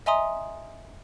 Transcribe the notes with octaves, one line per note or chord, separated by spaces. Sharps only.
D#5 E5 G#5 A#5 C6 D#6